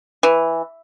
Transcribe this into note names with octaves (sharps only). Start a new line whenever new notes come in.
E3